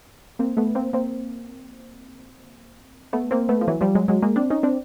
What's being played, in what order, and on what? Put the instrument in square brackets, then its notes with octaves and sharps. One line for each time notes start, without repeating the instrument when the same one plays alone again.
[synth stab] A#3 C4
A3 B3
A#3 C4
A#3 C4
A3 B3
A#3 C4
A3 B3
F3
E3 F#3
F3 G3
F#3 G#3
F#3 G#3
G#3 A#3
C4 D4
C#4 D#4
C4 D4